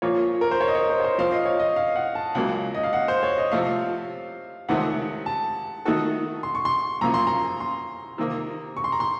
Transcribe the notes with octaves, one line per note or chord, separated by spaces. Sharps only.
A#2 F3 A#3 F4 C#5
A#4
C5
C#5
D#5
C#5
C5
C#5
C5
F3 C4 F4 C5 F5
D#5
C#5
D#5
F5
F#5
A5
C#2 C#3 F#3 A#3
D#5
F5
F#5
C5
C#5
D#5
C3 F3 A3 F5
C#2 C3 D#3 A3 F#5
A5
D#3 A3 D#4 F#4 A4
C6
C#6
C6
F#2 C#3 F3 A#3 C#4 A#5
C6
A#5
C6
C3 D#3 A#3
C#6
C6
A#5
C6